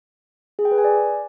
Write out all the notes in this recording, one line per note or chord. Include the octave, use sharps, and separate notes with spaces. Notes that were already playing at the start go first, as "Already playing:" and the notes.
G#4
G5
B4
G#5
D5